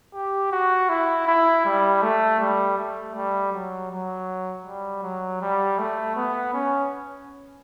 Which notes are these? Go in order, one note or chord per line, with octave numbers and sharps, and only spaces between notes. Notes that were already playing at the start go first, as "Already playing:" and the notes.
G4
F#4
E4
E4
G3
A3
G3
A3
G3
F#3
F#3
G3
F#3
G3
A3
B3
C#4